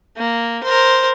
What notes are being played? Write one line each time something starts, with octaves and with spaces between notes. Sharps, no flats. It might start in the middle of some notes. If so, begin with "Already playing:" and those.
A#3
A#4 C5